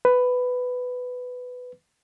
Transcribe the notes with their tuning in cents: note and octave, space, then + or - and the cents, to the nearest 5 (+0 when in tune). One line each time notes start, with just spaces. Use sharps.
B4 +10